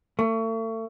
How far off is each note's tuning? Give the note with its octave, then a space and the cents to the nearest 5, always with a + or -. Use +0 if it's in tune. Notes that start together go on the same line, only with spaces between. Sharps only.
A3 +35